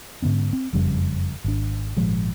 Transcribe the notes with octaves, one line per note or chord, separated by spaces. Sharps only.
G#2 D3 B3 C#4
C4
F#1 F2 C#3 G3
G#1 D4
G#1 A#2 F3 G#3